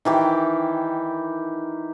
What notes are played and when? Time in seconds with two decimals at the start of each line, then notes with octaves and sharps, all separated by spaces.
0.05 D#3 E3 G4